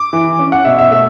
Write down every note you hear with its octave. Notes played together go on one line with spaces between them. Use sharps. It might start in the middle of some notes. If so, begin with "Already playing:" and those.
Already playing: D6
E3
C#4
F#5
B2 E5
E5
A3 E5